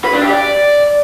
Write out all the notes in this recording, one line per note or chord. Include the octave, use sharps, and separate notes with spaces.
B4
D4
G4
D5